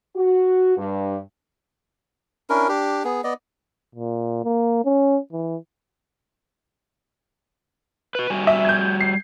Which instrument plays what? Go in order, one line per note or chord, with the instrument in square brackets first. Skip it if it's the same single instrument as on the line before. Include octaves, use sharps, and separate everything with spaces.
[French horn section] F#4
G2
[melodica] C#4 D4 E4 A#4
D4 G4
B3 G#4
B3 D5 D#5
[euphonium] A#2
A#3
C#4
E3
[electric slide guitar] F#4 B4
G3 F#4 G#5
[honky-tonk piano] E5
G6 G#6
C7